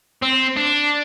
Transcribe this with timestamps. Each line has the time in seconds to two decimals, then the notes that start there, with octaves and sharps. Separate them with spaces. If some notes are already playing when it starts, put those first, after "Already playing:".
0.22 C4
0.56 D4